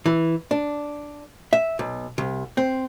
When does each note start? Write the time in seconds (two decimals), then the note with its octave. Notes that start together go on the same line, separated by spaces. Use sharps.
0.06 E3
0.51 D4
1.53 E5
1.79 B1
2.18 C2
2.57 C4